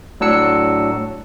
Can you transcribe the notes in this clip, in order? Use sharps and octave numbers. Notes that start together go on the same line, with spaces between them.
A2 F#3 D4 E6 C#7